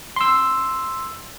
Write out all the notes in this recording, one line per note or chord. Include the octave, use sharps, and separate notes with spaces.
C6 E6